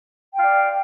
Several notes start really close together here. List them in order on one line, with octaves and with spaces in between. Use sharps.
G5 F5 D5